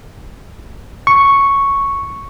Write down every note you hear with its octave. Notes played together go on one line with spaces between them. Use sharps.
C#6